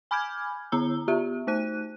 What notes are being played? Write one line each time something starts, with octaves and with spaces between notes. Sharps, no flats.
G#5 B5 D6 F6 G6 G#6
D3 B3 E4 A#5 E6 G7
B3 F4 G4 E5
A3 D#4 C5 F#6 D#7